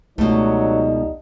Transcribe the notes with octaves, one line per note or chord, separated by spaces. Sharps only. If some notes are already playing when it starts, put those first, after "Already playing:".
C#2 G2 B2 F#3 A3 D4 D#4